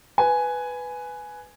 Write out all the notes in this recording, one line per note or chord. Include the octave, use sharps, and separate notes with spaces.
B4 G#5